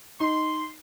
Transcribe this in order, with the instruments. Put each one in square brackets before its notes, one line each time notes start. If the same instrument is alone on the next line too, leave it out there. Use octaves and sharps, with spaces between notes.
[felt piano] D#4 [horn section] C6